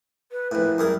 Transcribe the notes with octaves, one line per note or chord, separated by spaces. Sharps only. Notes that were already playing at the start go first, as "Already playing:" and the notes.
B4
A#1 A2 B4
F#2 G3 G#4 A#4